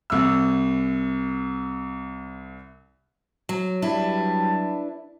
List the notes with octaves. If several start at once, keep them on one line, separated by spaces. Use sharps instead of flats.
C2 E6
F#3
F#3 G3 D4 E4 B4 A5